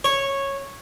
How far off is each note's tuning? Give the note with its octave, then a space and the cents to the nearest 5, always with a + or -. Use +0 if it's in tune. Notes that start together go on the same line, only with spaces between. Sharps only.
C#5 -10